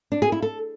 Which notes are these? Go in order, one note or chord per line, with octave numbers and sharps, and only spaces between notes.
D4
G#4
E4
A4